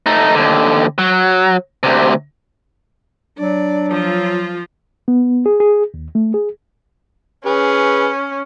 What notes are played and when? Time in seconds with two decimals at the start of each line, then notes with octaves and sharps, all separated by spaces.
0.06 A3 D#4
0.35 D#2 D3
0.98 F#3
1.83 D2 C3
3.39 F#3 D4 D5
3.91 F3 F4
5.08 B3
5.46 G#4
5.60 G#4
5.94 D#2
6.15 A3
6.34 G#4
7.46 C#4 G#4 B4